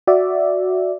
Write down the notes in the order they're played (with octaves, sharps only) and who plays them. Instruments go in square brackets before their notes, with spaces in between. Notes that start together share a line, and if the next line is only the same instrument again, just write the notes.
[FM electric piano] F#4 D5 E5